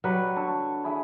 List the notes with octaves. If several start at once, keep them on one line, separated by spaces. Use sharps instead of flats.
F#3 G3 B4
D3 A4 C#6
E4 G#4 B5